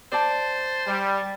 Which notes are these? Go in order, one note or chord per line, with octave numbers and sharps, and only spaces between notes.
C5 D5 G5 A5 A6
G3